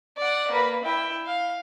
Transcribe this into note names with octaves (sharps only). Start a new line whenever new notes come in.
D5 F#5
A#3 B4
E4 G5
F5